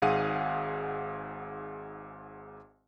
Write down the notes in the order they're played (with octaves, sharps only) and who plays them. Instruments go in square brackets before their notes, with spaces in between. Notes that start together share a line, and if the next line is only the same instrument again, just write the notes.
[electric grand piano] G#1 G#2 G#4 F5 F#5 D#7